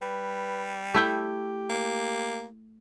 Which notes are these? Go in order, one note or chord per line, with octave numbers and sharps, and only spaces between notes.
G3 B4
A3 E4 G4 G5
A#3